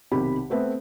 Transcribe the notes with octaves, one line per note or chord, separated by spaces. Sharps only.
B1 C3 D#3 G4 B5
A3 B3 C4 B4 E5